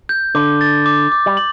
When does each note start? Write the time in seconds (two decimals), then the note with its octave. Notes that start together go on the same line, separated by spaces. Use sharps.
0.09 G6
0.35 D3 D6
0.61 A6
0.86 D6
1.12 D6
1.26 G3
1.37 F#7